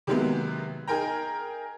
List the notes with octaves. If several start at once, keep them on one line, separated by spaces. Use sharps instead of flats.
C3 D#3 F#3 G#3 A#3 B3
D#4 G#4 A#4 G5 A#5